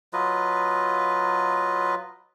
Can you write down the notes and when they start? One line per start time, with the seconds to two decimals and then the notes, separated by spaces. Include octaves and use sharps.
0.13 F#3 F4 B4 D#5